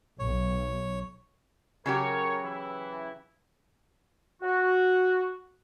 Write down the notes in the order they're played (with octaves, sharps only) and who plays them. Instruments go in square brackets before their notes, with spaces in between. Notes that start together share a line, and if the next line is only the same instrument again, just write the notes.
[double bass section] B1 [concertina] C#5
[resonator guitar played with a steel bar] C#3 F#3 G4 [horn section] A#4 C#5
[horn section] E3 E4
[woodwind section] F#4